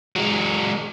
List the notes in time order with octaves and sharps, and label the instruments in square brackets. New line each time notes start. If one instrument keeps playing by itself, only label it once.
[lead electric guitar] F#3 G#3